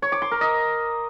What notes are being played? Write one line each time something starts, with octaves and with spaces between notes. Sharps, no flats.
C#5
D6
C6
A#4
D#5